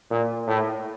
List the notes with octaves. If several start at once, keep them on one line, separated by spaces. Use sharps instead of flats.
A#2
A2